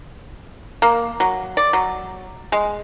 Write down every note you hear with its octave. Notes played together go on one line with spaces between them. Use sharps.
A#3
F#3
D5
F#3
G#3